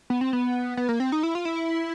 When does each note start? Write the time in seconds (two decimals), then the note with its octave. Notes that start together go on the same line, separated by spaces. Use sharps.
0.10 B3
0.21 C4
0.33 B3
0.77 B3
0.89 A#3
1.00 C4
1.12 D#4
1.23 E4
1.35 F4
1.45 E4